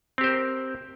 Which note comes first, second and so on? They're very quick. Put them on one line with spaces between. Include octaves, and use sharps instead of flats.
C4 G4 C5 A#4